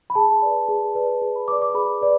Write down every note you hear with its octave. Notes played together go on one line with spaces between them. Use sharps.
B5
G#4 A5
B4 D5
G#4
B4 D5
G#4
B5
B4 D5 D6
D6
G#4 B5
B4 D5